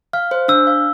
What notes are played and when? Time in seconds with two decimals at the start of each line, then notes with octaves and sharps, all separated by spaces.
0.13 F5 F6
0.31 C5
0.48 D4 E6
0.67 F5